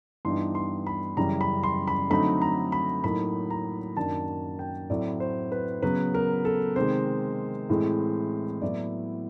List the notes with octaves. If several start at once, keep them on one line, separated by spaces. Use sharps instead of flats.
G2 E3 G3 B3 D#4 C6
C6
B5
F#2 C#3 E3 G3 A#5
B5
C6
B5
D3 F#3 A3 C4 D#4 B5
A#5
B5
A2 F#3 A#3 D#4 B5
A#5
F#2 D#3 F#3 A#3 D4 A5
G5
A2 F#3 A3 C4 E4 D5
C5
B4
C#3 F#3 B3 B4
A#4
A4
C3 D#3 G#3 C5
A2 E3 G#3 C4
A2 F#3 B3 E4 D5